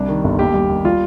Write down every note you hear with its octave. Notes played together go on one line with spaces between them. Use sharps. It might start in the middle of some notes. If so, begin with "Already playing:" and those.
Already playing: C2 G3 D4
D#3
G1
D#2 G4
G3
D#2
G3 F4